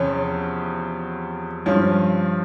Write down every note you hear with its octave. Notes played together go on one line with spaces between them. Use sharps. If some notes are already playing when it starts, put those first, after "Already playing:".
Already playing: E2 C3 F3 C#4
G2 F3 C#4